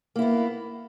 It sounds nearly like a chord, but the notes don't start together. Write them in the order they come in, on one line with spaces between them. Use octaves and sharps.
A#3 E4 B3